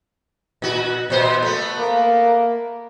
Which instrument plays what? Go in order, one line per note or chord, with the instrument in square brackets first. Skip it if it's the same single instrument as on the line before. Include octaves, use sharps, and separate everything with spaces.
[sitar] A#2 F#4
A#2 C5
A3 B3
[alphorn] A#3